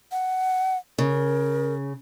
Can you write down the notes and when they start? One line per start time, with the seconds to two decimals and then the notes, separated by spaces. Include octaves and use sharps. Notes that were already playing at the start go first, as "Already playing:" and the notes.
0.12 F#5
0.98 C#3 A#4